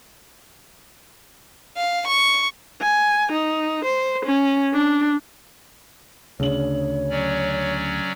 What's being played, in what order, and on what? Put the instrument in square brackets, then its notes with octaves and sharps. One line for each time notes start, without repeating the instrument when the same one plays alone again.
[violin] F5
C#6
[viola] G#5
D#4
C5
C#4
D4
[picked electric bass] D2 [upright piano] C#3 D4 F#7 [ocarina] C#5
[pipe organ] F#3 C#4 D5